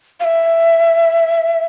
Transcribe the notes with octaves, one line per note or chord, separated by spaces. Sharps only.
F5
E5